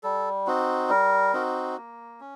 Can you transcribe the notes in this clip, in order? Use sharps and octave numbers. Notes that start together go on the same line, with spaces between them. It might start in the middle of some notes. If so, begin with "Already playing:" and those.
G3 A4
C4 D#4 F#4
G3 A#4
C4 D#4 F#4
A#3
C#4